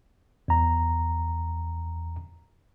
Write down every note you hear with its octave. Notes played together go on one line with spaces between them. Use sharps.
E2 A#5